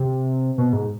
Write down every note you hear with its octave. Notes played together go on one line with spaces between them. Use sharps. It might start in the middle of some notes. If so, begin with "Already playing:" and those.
Already playing: C3
B2
G#2